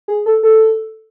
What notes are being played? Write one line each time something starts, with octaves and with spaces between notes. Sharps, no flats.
G#4
A4
A4